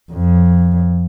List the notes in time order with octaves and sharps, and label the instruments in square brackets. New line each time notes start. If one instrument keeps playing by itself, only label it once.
[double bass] F2